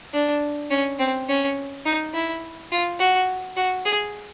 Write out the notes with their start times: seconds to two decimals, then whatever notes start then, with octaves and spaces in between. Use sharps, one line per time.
0.13 D4
0.71 C#4
0.99 C4
1.28 C#4
1.85 D#4
2.13 E4
2.71 F4
3.00 F#4
3.57 F#4
3.85 G#4